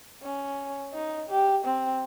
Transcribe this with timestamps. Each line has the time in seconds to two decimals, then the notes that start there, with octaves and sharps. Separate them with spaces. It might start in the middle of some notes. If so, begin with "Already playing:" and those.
0.23 C#4
0.93 D#4
1.29 G4
1.65 C4